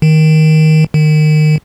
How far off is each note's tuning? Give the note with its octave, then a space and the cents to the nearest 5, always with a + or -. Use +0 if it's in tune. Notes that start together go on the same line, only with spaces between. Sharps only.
D#3 +10
D#3 -25